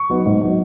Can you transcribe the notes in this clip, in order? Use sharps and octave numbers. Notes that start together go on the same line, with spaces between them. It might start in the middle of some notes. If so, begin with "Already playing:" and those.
Already playing: C#6
F#3 B3 D#4
G#2
F#3 B3 D#4